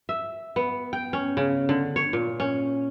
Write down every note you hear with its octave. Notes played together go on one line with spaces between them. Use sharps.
E5
B3
G5
C#4
C#3
D3
C#5
A#2
C#4